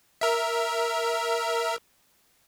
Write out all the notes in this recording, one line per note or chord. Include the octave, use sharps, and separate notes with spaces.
A#4 E5